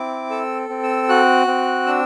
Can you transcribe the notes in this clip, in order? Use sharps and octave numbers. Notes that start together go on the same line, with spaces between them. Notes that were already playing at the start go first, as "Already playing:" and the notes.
Already playing: C4 E4 D6
A4 E6
C4
E6
F#4 F#6
C4
D4 E6